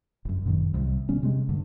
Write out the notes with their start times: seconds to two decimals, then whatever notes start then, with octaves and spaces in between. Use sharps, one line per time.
0.25 G1 F#2
0.46 F#2 A#2 D#3 F#3
0.74 C2 C3 F#3 G3
1.09 C3 G3 B3 C#4
1.23 C3 G#3
1.48 G#1 G2 D3